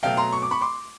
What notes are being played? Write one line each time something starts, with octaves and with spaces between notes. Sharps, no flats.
B2 F#3 A3 F5 G5
A#5 C6
C#6
D6
B5 C#6
C6 D6